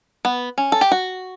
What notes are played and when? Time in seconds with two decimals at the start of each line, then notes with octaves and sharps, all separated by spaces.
0.25 B3
0.58 C#4
0.72 A4
0.81 G4
0.92 F#4